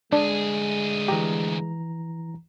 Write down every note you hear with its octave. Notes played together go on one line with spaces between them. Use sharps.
D2 G#3 D4 G#4
E3 G4 A#5